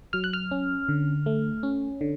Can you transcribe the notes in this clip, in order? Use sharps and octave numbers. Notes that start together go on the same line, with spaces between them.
F#3 F6
F#6
F6
C#4
D3
A3
C#4
D3